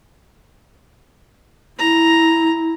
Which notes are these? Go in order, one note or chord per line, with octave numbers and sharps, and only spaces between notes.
E4 A#5